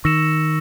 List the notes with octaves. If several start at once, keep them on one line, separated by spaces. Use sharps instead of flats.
D#3 C#6 E6 A#6 C#7 E7